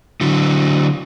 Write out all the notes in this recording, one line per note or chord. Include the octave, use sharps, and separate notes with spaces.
D3 F#3